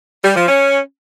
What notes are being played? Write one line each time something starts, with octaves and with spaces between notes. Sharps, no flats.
G3
F3
C#4